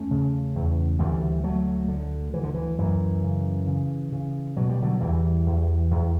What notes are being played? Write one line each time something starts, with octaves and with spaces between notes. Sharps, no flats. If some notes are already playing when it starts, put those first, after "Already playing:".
Already playing: E2 A3 C#4
C#3
E2
D2 E3 G3
D2 F#3 A3
D3
D2 E3
D3
E3
F#2 E3
C#3
C#3
C#3
B2 F#3
G3
D3 F#3
E2 E3 G3
E2
E2